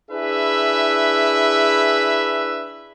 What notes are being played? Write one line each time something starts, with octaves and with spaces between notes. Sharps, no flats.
D4 E4 G#4 B4 E5